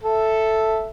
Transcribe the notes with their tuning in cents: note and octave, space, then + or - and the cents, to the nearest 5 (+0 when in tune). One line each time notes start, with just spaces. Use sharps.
A4 +0 E5 +0